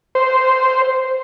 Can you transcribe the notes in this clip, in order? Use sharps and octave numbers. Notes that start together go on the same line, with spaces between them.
C5